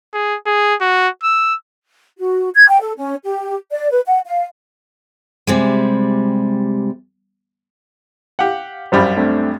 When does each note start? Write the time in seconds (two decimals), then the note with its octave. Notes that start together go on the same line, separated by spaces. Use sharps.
0.13 G#4
0.46 G#4
0.81 F#4
1.23 E6
2.18 F#4
2.55 G#6
2.69 G5
2.81 A4
2.97 C#4
3.24 G4
3.71 D5
3.91 B4
4.06 F#5
4.26 F5
5.47 C3 G3 G#3
8.39 G4 F5 F#5
8.92 A#1 F#2 G3 C5 F5 B5
9.17 A3 C4 D4